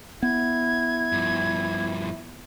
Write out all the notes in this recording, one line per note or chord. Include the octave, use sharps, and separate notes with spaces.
B3 E4 G#6
G2 F3